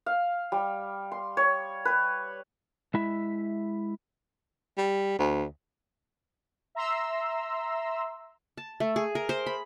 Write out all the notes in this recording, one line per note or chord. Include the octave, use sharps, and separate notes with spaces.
F5
G3
C6
C#5
B4
G#3 E4 E5
G3
D2
E5 A#5 C6 E6
A5
A3
G#4
A#4
C5
B5